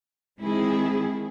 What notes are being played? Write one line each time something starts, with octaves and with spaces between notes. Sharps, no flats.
D#3 G#3 C4 E4 G#4